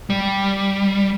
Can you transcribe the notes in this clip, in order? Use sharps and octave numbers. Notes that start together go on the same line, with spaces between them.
G3